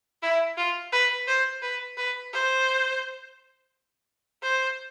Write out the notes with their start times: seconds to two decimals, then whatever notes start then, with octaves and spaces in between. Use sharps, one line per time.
0.22 E4
0.57 F4
0.92 B4
1.27 C5
1.62 B4
1.97 B4
2.33 C5
4.43 C5